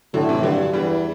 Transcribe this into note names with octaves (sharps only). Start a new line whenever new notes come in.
A2 D3 F#3
C3 E3
G2 D3 F#3
E2 E3 G3